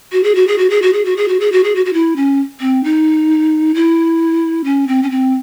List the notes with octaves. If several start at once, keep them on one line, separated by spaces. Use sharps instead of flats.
F#4
G#4
F#4
G#4
F#4
G#4
F#4
G#4
F#4
G#4
F#4
G#4
F#4
G#4
F#4
F#4
E4
C#4
C4
D#4
E4
C#4
C4
C#4
C4